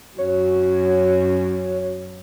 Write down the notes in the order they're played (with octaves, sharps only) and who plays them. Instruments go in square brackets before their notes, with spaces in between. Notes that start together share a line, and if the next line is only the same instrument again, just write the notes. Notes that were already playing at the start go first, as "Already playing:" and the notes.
[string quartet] F#2 [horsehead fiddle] C#4 F#4 [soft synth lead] C#5